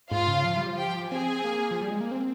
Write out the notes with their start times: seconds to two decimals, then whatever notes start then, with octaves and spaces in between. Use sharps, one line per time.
0.11 G#2 F4 F5
0.27 C#3
0.44 F3
0.57 G3
0.68 F3
0.77 G4 G5
1.11 C4 G#4 G#5
1.44 A#3
1.71 F3
1.81 G3
1.90 G#3
2.00 A#3
2.11 C4